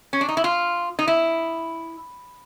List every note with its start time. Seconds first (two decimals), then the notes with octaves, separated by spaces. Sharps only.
0.13 C#4
0.21 D4
0.29 D#4
0.37 E4
0.44 F4
0.99 D#4
1.08 E4